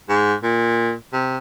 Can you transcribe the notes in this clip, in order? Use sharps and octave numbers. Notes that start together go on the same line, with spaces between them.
G#2
A#2
C3